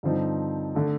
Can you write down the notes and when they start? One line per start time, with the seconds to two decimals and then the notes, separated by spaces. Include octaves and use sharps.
0.03 G2 D3 F3 C4 D#4
0.75 D3 A3